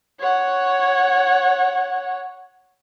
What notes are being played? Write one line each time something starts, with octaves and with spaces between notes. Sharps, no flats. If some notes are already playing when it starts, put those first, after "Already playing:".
C#5 F#5